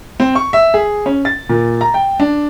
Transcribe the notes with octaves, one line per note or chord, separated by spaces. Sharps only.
C4
C#6
E5
G#4
C#4
A6
A#2
A#5
G5
D4